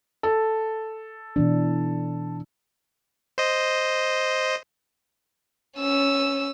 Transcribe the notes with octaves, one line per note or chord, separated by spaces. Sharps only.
A4
B2 E3 D4
C5 D#5
C#4 E6